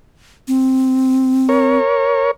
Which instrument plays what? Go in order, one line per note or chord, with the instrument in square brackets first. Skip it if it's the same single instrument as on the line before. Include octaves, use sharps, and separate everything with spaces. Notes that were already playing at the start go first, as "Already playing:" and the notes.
[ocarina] C4
[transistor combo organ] A#4 C#5